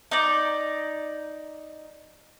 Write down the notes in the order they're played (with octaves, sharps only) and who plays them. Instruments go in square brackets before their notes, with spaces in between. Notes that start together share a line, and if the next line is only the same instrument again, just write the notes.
[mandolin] D#4 D5